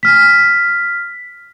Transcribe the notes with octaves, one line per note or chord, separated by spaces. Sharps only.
F6 B6